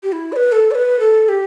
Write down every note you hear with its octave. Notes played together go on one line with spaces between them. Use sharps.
G4
E4
D5
B4
A4
D5
B4
A4
G4